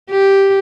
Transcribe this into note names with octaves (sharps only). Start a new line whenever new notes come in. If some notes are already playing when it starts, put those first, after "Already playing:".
G4